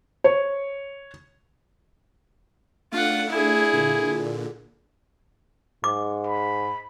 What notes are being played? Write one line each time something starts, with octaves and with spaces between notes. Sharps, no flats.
C#5
A3 D4 F4 F#5
E4 G#4
A#2 D3
G#2 D6
B5